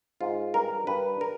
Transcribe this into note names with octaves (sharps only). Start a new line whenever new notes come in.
G#2 F4
G2 A#4
G2 B4
A#4